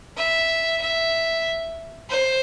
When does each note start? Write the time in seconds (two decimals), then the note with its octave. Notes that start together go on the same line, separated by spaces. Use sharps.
0.17 E5
0.81 E5
2.10 C5